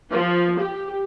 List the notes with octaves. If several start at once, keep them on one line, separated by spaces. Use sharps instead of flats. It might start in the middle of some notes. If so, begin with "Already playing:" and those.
F3
G4